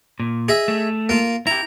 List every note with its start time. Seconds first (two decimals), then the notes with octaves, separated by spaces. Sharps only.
0.20 A#2
0.48 G#4 D#5 E5
0.68 A3
1.09 A#3 F4
1.47 E4 G4 A#5